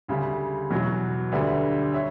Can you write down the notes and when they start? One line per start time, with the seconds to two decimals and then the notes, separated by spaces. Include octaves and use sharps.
0.08 D2 C#3 G3
0.71 E2 B2 F#3
1.32 D2 D3 G3 B4 D5
1.94 C#5 E5